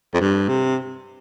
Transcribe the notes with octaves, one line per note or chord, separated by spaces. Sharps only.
F2
G2
C3